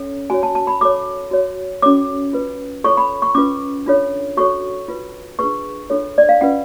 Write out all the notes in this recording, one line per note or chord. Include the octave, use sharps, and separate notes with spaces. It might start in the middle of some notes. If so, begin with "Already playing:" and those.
Already playing: C#4 A4 C#5
F#4 C#5 G#5
A5
A5
B5
F#4 A4 C#5 D6
F#4 C#5
C#4 F#4 A4 C#5 D6
F4 B4
F4 A4 C#5 C#6
B5
C#6
C#4 F4 B4 D6
D4 F4 A4 C#5
F#4 A4 C#5 C#6
F4 B4
D4 F4 G#4 B4 C#6
D4 F4 A4 C#5
D5
F5
C#4 F4 B4 F#5